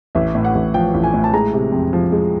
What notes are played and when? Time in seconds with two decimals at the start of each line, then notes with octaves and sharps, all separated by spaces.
0.15 A1 E5
0.35 A2
0.45 F#5
0.55 A1
0.74 F3 G5
0.94 A1
1.04 G#5
1.14 A2
1.24 A5
1.33 G#3 A#5
1.53 C3
1.72 F2
1.93 F3
2.12 G#3